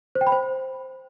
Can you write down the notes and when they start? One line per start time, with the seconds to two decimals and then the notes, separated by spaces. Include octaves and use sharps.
0.15 C5
0.21 G5
0.27 B5
0.32 C5